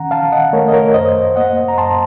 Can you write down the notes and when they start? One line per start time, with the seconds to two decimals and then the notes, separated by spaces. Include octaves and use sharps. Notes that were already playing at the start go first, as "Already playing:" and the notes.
Already playing: D#3 C#4 F#5 A#5
0.11 D#3 F5 A5
0.32 D#5 F#5
0.53 A3 A#4 C#5
0.68 D#5
0.73 A#4 C#5
0.94 F#2 C5 D#5
1.36 A#3 D#5 F#5
1.68 A#5
1.78 F#2 A5 C6